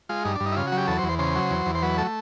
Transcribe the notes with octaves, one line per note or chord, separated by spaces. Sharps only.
G#3 F4
G2 D#4
D4
G2
D#4
E4
C#3 F4
F#4
F#3
G4
E2 A4
C5
E2
C5
C#3 C5
F#3
E2
E2
C5
F#3 B4
A3 A4